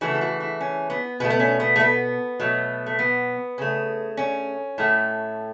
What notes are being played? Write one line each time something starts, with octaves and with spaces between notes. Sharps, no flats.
C#3 E3 A3 F#4
A4
F#4
E4
C#4
B3
B2 A3 B3
B3
C#4
B3
A3
B3
B2 F#3 A3
A3
B3
C#3 A3
C#4
A2 A3